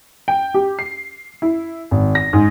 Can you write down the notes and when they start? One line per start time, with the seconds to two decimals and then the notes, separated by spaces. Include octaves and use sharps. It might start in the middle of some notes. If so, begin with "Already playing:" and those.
0.28 G5
0.54 G4
0.79 C7
1.42 E4
1.91 G#1
2.15 A#6
2.33 G#2